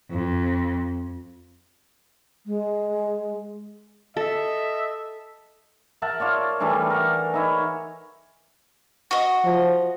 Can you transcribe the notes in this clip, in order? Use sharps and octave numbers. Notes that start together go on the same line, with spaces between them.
F2
G#3
A4 D#5 E5
A#4 E5 F#5 A5
F4 C#5 D5
E3 G3 A3 D4
A#4 F#5
D#4 E4 C#5
F#4 D#5
F3